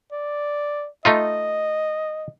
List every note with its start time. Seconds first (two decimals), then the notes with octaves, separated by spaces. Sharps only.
0.12 D5
1.05 A3 D#4 F4 D#5